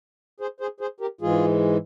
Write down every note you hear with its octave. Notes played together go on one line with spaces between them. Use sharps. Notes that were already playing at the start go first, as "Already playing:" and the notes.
G#4 C5
G#4 C5
G#4 C5
G4 A#4
G#2 E3 G#3 F4 G#4